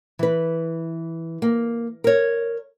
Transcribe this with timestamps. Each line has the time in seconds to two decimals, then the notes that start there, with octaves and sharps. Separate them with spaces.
0.19 E3 B4
1.42 A#3
2.04 A#4 C#5